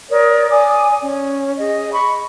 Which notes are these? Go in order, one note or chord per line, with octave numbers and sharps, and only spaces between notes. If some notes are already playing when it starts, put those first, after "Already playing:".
A#4 C#5 D5 D#6
D5 G#5 D6 D#6
C#4
G#4 D#5
B5 C#6